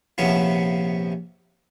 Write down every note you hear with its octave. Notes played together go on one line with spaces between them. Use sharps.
A#1 C3 F3 B3 C#4 E4